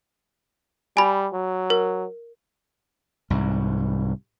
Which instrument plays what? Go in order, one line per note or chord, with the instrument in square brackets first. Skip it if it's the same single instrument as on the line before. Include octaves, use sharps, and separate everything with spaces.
[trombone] G3 [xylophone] G#5 B5
[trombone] F#3
[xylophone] A#4
[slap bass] C2 G#2